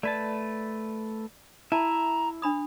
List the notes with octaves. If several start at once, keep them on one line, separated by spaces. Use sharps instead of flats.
A3 B4 D5 A5
E4 E5 A5 A#5
D4 B5 D#6